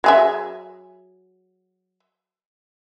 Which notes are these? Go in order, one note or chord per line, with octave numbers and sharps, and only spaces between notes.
F#3 G#4 E5